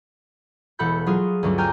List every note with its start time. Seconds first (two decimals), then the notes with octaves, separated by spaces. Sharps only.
0.79 E1 A4 F#5 B5 G6
1.06 F#3 F4 G#4
1.43 D2 G2 F#3 C#4 D4
1.58 G5 G#5 A#5 F6 G6